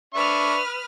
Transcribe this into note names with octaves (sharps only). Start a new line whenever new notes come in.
D4 B4 E5 C#6 D#6 F6